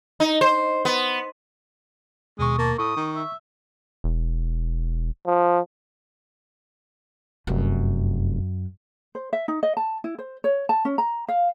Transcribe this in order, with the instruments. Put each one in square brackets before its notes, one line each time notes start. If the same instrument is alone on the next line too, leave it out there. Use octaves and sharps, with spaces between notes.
[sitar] D#4
C5
B3
[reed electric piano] D#2 B2 C#6 [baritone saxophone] G#3 [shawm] D#6
[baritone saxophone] A#3 [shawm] A5
[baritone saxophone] A2 [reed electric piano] C#6 [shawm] D#6
[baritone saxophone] D#3
[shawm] E5
[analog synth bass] E1
[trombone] F3
[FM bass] F1 [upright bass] F#2
[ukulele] C5
E5
D#4
D#5
A5
E4
C5
C#5
A5
C#4
A#5
F5